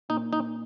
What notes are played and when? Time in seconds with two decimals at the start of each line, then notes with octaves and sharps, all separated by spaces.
0.09 A#2 D#4
0.33 D#4